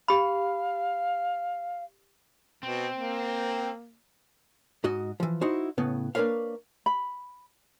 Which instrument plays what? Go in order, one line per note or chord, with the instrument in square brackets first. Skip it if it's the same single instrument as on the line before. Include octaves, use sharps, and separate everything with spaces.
[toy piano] G4 B5 [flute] F5
[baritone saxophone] B2 [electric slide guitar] C4
[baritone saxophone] A#3
[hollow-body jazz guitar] G#2 F#4 D#5
E3 F3
D#4 E4 F#4 C5
A2 C#3 B3
A#3 D4 A#4 B4 C#5 F5
[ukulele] B5